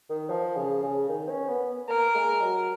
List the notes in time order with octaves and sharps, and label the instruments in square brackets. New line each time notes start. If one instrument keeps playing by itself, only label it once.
[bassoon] D#3
F3
C#3
C#3
D#3
C#4
B3
[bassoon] A#3 [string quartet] A#4
[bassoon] G#3
F#3